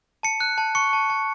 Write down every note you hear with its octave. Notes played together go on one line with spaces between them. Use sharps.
A5 C#7
F#6
A5
C#6 C#7
A5
A5